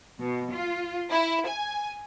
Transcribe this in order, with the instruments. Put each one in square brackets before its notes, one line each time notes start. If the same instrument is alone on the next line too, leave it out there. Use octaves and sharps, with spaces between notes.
[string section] B2
F4
E4
G#5